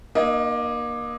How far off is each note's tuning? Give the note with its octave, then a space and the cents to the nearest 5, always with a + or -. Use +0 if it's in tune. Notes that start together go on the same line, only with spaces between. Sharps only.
A#3 +25 D#4 -30 D#5 +15